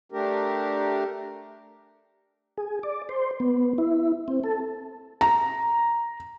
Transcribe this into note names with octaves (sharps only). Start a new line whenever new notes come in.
A3 D4 G4 A#4
G#4
D5
C5
B3
E4
C4
A4
A#5